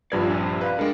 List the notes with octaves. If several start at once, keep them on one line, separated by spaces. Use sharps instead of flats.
A#1 G2 F4 G4 A#4 B4 D5 G#6
D4 G#5
C3 C4
B4 D5 F5 B5
G#3 D4 A#4 G5